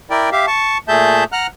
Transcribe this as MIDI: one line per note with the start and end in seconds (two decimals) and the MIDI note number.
0.10 0.30 64
0.10 0.30 70
0.10 0.30 74
0.10 0.30 79
0.32 0.46 67
0.32 0.46 76
0.32 0.46 77
0.47 0.78 81
0.47 0.78 85
0.88 1.24 46
0.88 1.24 57
0.88 1.24 68
0.88 1.24 76
0.88 1.24 81
0.88 1.24 91
1.32 1.47 78
1.32 1.47 82
1.32 1.47 89
1.32 1.47 90